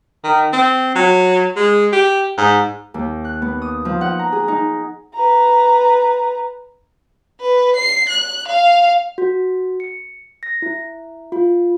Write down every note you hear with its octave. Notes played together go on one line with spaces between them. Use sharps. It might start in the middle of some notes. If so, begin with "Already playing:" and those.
D#3
C4
F#3
G#3
G4
G#2
D#2
F#6
B3
D#6
F3
F#5
A#5
G#4
D#4
B4 A#5
B4
C7
F#6
F5
F#4
C#7
A#6
E4
F4